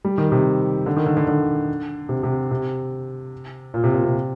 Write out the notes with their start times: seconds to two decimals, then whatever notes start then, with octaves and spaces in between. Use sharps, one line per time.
0.05 G3
0.18 D#3
0.32 C3
0.86 D3
0.96 D#3
1.06 D3
1.17 D3
1.27 D3
2.09 C3
2.23 C3
2.51 C3
3.74 A#2
3.84 C3
3.94 A#2
4.04 C3